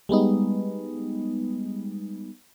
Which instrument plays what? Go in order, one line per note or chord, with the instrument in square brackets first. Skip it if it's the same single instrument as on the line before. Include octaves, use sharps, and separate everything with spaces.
[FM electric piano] G3 G#3 B3 D#4